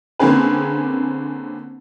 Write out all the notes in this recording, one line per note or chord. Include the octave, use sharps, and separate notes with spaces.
D3 A#3 C4 C#4 G#4 B4